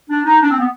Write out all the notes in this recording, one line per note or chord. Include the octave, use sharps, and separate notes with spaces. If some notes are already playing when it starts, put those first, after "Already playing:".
D4
D#4
D4
C4
B3